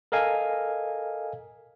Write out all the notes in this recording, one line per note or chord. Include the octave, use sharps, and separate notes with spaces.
A4 A#4 D#5 F5 G#5